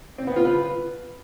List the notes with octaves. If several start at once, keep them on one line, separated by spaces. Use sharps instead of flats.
C4
B3
F4
B4